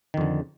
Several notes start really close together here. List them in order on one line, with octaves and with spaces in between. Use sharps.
D#3 F2 D3